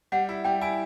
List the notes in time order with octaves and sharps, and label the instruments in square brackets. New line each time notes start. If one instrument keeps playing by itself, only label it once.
[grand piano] G3 [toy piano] F#5
[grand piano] E4
[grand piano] G3 [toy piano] G5
[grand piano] E4 [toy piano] G#5